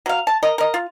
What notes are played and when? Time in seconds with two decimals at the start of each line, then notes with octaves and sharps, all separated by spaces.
0.06 F#3 F5
0.27 A5
0.43 A#4 D#5
0.58 A#4 D#5
0.74 F4